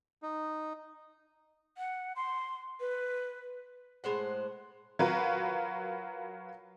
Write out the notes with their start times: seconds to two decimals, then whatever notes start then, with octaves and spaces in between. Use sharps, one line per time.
0.22 D#4
1.78 F#5
2.16 C6
2.80 B4
4.04 A2 G#3 C5 F#5
4.99 F#3 F4 F#4 A#4 B4